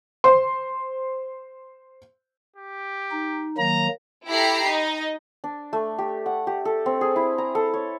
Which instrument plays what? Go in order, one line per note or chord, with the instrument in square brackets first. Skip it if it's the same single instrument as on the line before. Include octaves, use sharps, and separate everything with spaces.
[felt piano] C5 C6
[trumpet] G4
[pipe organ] D#4
[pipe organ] D#3 F#3 A#3 [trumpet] A#5
[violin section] E4 G4 A4 A#5 B5 C7
D#4 D#5
[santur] D4
A3
G4
F#5
G4
A4
C4
G#4
E4
A#5
A4
C#5